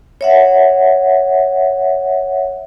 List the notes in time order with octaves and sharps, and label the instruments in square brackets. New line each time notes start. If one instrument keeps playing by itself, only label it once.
[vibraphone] C#5 E5 F#5